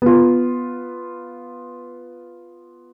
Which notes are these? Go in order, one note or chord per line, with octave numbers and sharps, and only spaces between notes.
B3 F4